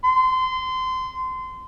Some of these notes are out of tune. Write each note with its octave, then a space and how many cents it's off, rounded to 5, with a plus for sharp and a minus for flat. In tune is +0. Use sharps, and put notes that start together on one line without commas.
C6 -25